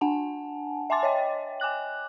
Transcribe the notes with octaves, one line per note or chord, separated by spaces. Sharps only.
D4 F#5 G#5 A5
E5 G#5 A5 C6 D6 A6
C#5 D#5 G5
G#5 D6 F#6 F#7